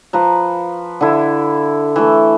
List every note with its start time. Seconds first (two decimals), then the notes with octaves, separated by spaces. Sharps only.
0.13 F3 B4 A#5
1.01 D3 E4
1.96 E3 A3